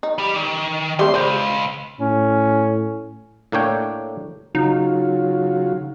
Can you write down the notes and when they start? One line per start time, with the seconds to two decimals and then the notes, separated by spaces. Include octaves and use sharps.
0.03 D#4
0.18 G3 G4
0.36 D#3
0.99 G3 A3 C4 C6
1.14 C#2 E3 C5 D5
2.01 A2 C#4
3.52 A2 A#3 D4 C#5 G5
4.55 C#3 F#3 D#4 F4